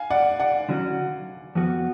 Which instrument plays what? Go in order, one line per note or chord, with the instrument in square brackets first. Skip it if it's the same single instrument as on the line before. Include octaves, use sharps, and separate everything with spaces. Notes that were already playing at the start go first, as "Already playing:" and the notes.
Already playing: [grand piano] F5 G#5
D5 F#5
D5 F#5
[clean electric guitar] D3 F#3 C#4 F#4
F2 F3 B3 F#4